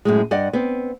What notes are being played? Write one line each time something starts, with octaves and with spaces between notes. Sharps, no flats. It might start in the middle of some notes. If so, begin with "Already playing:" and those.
F#2 A2 G#3
G2 D5 D#5 F#5
B3 C4